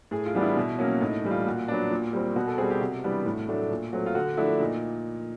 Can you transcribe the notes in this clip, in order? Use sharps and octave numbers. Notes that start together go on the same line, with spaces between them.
A2 G#4
F4
E3 G3 B3 D4
E4
B2
F#3 A#3 C#4
A2 D#4
E3 G3
F4
A#2 F#4
F#3 B3 D4
A#2
G3 C4
B2 F#4
A4
G3 C4 G#4
G4
C3 F#4
E3 G3 B3 D4
A2
F#3 A3 D4
A#2
F#3 A3 C4
F4
D3 F#4
F3 A3 D4 E4
A#2 D#4